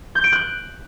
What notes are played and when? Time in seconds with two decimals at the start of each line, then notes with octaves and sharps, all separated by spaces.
0.15 G6
0.24 D7
0.32 F#6